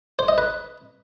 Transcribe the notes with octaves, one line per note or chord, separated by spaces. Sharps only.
C5
D#5
B4